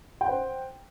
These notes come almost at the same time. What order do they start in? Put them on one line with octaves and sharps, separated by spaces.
G5 F#5 C5